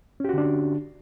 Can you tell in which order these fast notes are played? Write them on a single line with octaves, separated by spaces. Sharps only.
C#4 G4 F#4 D3 D4